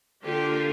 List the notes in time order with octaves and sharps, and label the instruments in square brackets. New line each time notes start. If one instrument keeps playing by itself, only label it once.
[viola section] D3 A#3 D4 F4 G4